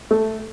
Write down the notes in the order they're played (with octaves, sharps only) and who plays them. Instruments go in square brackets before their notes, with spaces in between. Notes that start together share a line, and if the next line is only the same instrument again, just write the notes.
[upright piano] A3